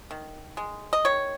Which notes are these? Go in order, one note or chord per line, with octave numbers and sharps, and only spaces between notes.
D#3
G#3
D#5
D#3 C#5